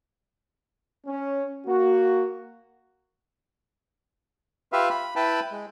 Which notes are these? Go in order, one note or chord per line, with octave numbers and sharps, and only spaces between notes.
C#4
A#3 F#4
F4 G4 B4 E5 F5
B5
E4 B4 G5 A5 B5
G#3